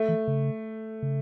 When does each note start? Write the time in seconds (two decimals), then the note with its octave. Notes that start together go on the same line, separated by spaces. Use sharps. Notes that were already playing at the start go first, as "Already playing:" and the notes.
Already playing: A3
0.09 E3
0.28 C#3
1.03 C#3